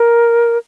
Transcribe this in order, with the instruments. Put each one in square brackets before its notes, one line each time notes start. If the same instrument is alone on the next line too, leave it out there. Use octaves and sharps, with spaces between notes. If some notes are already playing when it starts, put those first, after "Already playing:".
Already playing: [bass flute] A#4